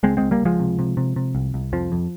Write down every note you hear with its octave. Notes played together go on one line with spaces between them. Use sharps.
C#2 G#3 C4
C#2 G#3 C4
G3 A#3
C#2 F3 G#3
C3
C3
C3
C3
C2
C2
F2 F3
F2